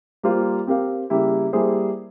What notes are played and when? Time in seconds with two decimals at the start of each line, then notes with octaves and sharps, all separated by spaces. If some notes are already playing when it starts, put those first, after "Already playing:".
0.23 G3 A#3 F4 C5
0.67 C4 G4 A#4 F5
1.10 C#3 G3 A#3 E4 G4
1.53 G3 A#3 E4 G#4 C5